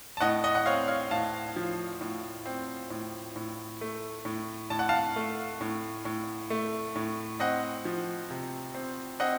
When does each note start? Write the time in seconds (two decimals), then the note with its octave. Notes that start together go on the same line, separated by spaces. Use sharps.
0.17 A5
0.21 A2 D#5 F#5
0.44 D#5 F#5
0.55 F#5
0.66 C4 C#5 F5
0.88 C#5 F5
1.11 A2 F5 A5
1.56 F3
2.01 A2
2.46 C4
2.90 A2
3.36 A2
3.81 A3
4.25 A2
4.70 A2 A5
4.79 F#5
4.89 F5 A5
5.16 A3
5.61 A2
6.05 A2
6.50 A3
6.96 A2
7.40 C4 D#5 F#5
7.85 F3
8.31 C3
8.75 C4
9.20 C4 D#5 F#5